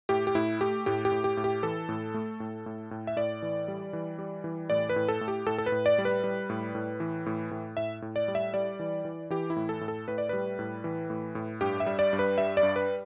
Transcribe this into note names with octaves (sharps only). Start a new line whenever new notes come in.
A2 G4
G4
A2 E4
A3 G4
A2 G4
G4
A2
G4
A2
G4
E3 A4
A2
A3
A2
A2
A2
E5
A2 D5
E3
G3
E3
G3
E3
A2 D5
B4
A2
A4
A2
G4
A2 A4
A4
B4
A2
D5
G3
B4
G3
A2
A2
E3
A2
A2
A2 E5
A2
D5
G3
E5
G3 D5
E3
E3
E3 G4
E4
A2
A4
A2
A4
A2 B4
D5
G3 B4
A2
E3
A2
A2
G2 G4
E5
G3
D5
G2
B4
G3 E5
D5
G2
B4